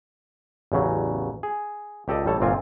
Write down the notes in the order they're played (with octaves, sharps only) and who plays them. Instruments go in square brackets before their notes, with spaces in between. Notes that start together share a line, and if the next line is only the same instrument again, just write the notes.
[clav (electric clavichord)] A1 E2 C#3 F#3
G#4
C#2 G4 A4 D5 D#5
A1 G3 A4 C#5 A5
G1 A#2 C4 F4 A#4 G#5